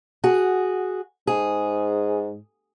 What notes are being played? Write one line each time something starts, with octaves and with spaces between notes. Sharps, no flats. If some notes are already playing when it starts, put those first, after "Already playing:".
F#4 G#4
G#2 G#4